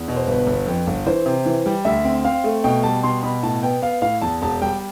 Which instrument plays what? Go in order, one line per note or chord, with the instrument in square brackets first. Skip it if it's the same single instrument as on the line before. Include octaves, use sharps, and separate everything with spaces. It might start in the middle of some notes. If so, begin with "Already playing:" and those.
Already playing: [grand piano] E2
B2
C5
G1 B4
G1
F2
G1
E3 C5
C3
E3
G3
D2 E5
C4
C4 F5
A3
B2 G5
G3 A5
B2 C6
B2 B5
A2 A5
B3 G5
B3 F5
A2 F5
E2 A5
E1 A5
G3 G5